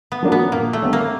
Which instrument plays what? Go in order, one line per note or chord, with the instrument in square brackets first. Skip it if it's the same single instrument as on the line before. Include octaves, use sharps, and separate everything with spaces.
[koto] B3
[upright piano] F3 A#3 D4 F#4
[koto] B3
[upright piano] A#2 [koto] A#3
[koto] A3
[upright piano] G3 B3 D4
[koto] A#3